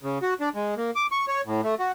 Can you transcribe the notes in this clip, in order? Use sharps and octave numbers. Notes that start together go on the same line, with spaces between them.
C#3
F#4
D4
G#3
A#3
D6
C#6
C#5
A2
A3
F#4